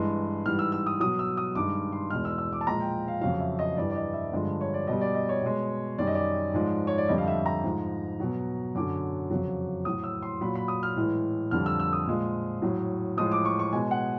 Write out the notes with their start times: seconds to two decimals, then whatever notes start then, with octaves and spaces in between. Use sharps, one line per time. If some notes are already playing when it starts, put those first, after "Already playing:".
Already playing: G2 E3 G#3
0.45 G#2 E3 G3 F6
0.59 E6
0.72 E6
0.86 D#6
1.00 B2 F#3 D#6
1.19 E6
1.37 D#6
1.55 G2 D#3 G#3 D6
1.92 C6
2.10 E2 B2 G#3 F6
2.25 E6
2.38 E6
2.53 D6
2.61 A5
2.66 A#2 F3 G#3 A#5
2.80 G5
3.08 F5
3.21 F2 C#3 F#3 F5
3.40 E5
3.59 D#5
3.77 G2 E3 G3 D5
3.91 D5
3.96 D#5
4.14 E5
4.32 G2 D3 F3 G#3
4.61 C#5
4.74 D5
4.87 B2 G3 D#5
5.01 D5
5.15 D#5
5.29 C#5
5.42 B2 G#3
5.98 F#2 D#3 G3 D5
6.07 D#5
6.14 D5
6.54 G#2 F3 G#3
6.87 C#5
6.98 D5
7.08 F2 D3 G3 D#5
7.18 F5
7.28 E5
7.46 A#5
7.64 G#2 F3 G#3
8.20 B2 F#3
8.75 F#2 D3 F#3 D6
9.30 F2 C#3 F#3
9.85 A2 F#3 D#6
10.04 E6
10.22 C6
10.41 A#2 F#3 B5
10.55 B5
10.68 D#6
10.83 F6
10.96 A2 E3 G#3
11.51 F2 D3 G3 F6
11.66 E6
11.80 E6
11.93 D#6
12.07 A#2 F3 G#3
12.62 A2 F#3
13.17 A2 F3 G#3 D#6
13.32 D6
13.45 C#6
13.59 C#6
13.73 B2 G#3 G#5
13.91 F#5